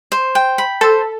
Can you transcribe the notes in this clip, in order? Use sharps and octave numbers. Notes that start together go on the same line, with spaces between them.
C5
G5
B5
A4 C5